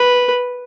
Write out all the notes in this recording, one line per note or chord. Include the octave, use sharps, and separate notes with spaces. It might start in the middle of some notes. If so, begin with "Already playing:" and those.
Already playing: B4